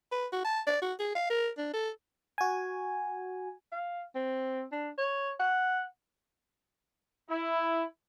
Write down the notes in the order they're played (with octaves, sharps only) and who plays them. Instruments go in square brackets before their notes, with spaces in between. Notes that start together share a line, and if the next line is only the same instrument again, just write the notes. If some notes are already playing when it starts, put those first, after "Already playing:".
[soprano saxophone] B4
F#4
A5
D5
F#4
G#4
F5
A#4
D4
A4
[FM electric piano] F#4 G#5
[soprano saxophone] F5
C4
D4
C#5
F#5
[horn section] E4